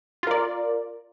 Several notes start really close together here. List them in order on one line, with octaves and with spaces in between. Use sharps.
F4 A#4 D5